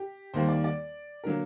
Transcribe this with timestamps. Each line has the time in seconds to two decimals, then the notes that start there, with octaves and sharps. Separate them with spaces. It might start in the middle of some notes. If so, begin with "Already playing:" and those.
Already playing: G4
0.34 D#2 D#3 G3 A#3 C5
0.48 D5
0.64 D5
1.24 D3 F#3 A#3 A#4